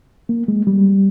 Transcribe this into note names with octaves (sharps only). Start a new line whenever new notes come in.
A#3
G#3
G3